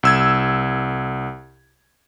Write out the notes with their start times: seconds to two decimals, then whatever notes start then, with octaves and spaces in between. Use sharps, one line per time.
0.03 C2 E6 G#6